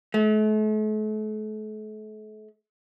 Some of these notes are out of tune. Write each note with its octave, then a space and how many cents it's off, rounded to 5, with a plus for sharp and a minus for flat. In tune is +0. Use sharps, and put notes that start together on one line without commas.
A3 -40